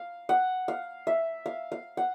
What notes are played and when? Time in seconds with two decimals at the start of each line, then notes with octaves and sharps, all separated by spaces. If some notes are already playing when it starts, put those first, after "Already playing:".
Already playing: F5
0.29 F#5
0.68 F5
1.07 E5
1.46 F5
1.72 F5
1.97 F#5